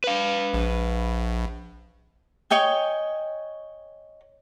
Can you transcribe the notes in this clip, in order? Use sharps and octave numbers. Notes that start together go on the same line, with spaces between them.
B4 F5
A#1
C#5 D#5 G5 G#5